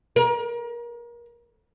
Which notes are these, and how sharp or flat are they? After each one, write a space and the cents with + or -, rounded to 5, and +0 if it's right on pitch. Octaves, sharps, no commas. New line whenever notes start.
A#4 +30